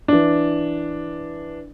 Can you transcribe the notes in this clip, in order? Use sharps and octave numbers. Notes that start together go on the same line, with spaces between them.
E3 D4